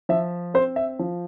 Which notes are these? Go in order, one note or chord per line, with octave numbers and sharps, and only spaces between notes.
F3 E5
C4 C5
E5
F3